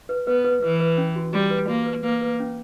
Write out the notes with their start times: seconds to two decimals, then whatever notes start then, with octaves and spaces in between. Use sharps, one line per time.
0.09 B4
0.27 B3 B4
0.44 B4
0.62 E3 B4
0.80 B4
0.98 C#4
1.16 F#4
1.33 G3 F#4
1.51 B4
1.68 A#3 F#4
1.86 B4
2.04 A#3 B4
2.21 B4
2.40 C#4